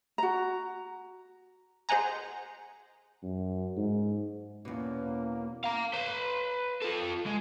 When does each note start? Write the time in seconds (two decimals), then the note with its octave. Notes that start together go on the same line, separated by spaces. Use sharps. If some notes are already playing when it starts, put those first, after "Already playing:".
0.18 F#4 A#5
1.89 G#4 C5 D#5 F#5 G#5 A#5
3.23 F#2
3.77 G#2
4.65 E2 B2 A#3 C#4
5.64 F5 A#5
5.93 B4 C6
6.82 F4 A4
7.26 G#3